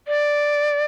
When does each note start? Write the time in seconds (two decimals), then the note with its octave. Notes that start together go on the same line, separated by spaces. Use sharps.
0.08 D5